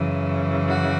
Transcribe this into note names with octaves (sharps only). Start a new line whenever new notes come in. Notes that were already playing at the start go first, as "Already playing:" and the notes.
Already playing: F#2 C#3 E3
F#4